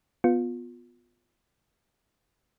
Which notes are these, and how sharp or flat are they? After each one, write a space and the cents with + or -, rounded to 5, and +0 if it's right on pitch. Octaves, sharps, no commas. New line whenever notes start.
B3 +0 F4 +20